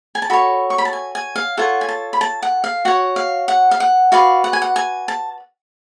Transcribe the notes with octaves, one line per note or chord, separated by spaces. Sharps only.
G#5
A5
F#4 A4 C#5 B5
C#6
B5
A5
G#5
G#5
F5
F4 A4 C#5 F#5
G#5
A5
B5
A5
F#5
F5
F#4 C#5 F#5
F5
F#5
F5
F#5
F#4 B4 D5 F5
F#5
G#5
F#5
G#5
A5